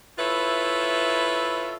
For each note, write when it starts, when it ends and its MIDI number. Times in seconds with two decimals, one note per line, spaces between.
0.18 1.76 64
0.18 1.76 65
0.18 1.76 69
0.18 1.76 71
0.18 1.76 73
0.18 1.76 76